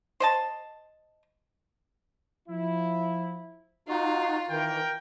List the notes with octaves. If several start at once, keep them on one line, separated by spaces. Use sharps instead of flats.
C5 D#5 A5
F3 E4
D#4 F4 F#4
D#3 E3 A#4 G5